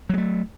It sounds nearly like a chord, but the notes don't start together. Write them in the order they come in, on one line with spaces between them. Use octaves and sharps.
F#3 G#3 A3